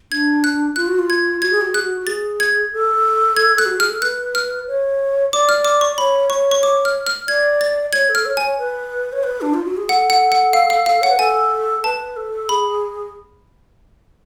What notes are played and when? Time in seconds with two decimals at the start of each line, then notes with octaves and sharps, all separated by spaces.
0.12 D4 G#6
0.44 F#6
0.76 F4 F#6
0.88 F#4
0.99 F4
1.10 G#6
1.42 F#4 G#6
1.51 G#4
1.62 F#4
1.71 G#4 F#6
1.81 F#4
2.01 F#4
2.06 G#4 A6
2.40 G#6
2.72 A4
3.36 G#6
3.58 F#6
3.66 F#4
3.77 G#4 F6
3.90 A4
4.02 B4 F#6
4.35 F6
4.67 C#5
5.33 D5 D6
5.49 F6
5.65 D6
5.81 C#6
5.98 C#5 B5
6.30 C#5 C#6
6.51 C#6
6.63 D6
6.85 F6
7.07 F6
7.27 D5 G#6
7.61 A6
7.93 C#5 G#6
8.09 A4
8.15 F6
8.26 C#5
8.37 C#5 G#5
8.58 B4
9.13 C#5
9.23 B4
9.41 D4
9.54 F4
9.65 F#4
9.77 G#4
9.89 A4 F#5
10.10 F#5
10.32 F#5
10.53 F5
10.70 F5
10.86 F5
11.02 C#5 F#5
11.10 B4
11.18 A4 G#5
11.84 B4 A5
12.17 A4
12.49 G#4 B5